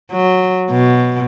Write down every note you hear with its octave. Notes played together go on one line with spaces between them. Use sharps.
F#3
B2